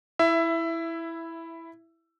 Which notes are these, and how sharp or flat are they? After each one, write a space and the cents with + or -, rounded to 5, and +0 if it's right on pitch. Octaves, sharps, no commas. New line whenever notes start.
E4 +0 E5 +15